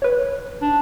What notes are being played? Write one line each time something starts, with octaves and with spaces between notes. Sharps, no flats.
B4 C#5
D4